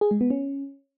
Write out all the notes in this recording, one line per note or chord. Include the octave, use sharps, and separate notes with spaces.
G#4
G#3
B3
C#4